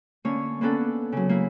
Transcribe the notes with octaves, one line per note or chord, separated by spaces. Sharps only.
D3 A#3 C#4 C#5
A#3 B3 C#4 D4 A4 F#5
C#3 F#3
A#3 E4